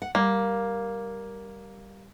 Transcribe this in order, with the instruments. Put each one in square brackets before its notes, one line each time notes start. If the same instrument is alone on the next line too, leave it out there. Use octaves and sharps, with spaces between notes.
[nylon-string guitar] F#5
[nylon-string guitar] G3 [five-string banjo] A#3